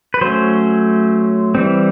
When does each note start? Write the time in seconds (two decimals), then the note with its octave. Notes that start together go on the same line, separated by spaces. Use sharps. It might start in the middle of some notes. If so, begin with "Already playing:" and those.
0.14 B4
0.21 F#3 A3 C#4 C5
1.55 E3 G3 C4